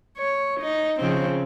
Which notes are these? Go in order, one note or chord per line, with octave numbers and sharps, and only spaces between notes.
C#5
D#4
C#3 F3 C4